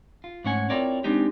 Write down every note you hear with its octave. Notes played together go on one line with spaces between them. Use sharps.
F4
G#2 A3 C#4 F#5 G#5
C4 E4 F4 A#4 C#5 D5
G#3 C4 D4 D#4 G4